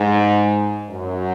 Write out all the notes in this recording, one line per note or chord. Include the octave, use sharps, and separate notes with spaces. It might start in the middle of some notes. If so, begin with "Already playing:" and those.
Already playing: G#2
F#2